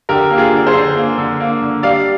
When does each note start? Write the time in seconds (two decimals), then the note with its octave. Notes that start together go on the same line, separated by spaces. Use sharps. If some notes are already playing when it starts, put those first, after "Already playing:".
0.09 D3 G4 A#4
0.30 A#3
0.38 F4 G#4
0.52 D3
0.67 G#4 C5
0.74 D3
0.96 A#3
1.18 D3
1.40 A#3
1.62 D3
1.83 G3 D5 F5